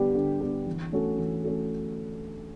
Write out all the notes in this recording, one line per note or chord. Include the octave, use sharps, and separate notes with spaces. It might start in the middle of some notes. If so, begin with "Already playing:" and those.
Already playing: D3 G3 B3 D4 G4
D3
G3 B3 D4 G4
E3
A3 C#4 F#4 A4
E3
A3 C#4 F#4 A4